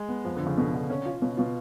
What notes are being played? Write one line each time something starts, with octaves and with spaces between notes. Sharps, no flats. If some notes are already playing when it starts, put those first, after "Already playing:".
Already playing: G#3
B3
F2 F3
F2 D3
C#3
B2 D3
D3
C#4
F4
B2 C#4
B2 F4